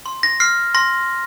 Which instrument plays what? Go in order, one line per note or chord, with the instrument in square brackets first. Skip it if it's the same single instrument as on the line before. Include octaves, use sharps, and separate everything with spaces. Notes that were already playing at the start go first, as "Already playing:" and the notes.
[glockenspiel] C6
A#6
F6 C7
C6 A#6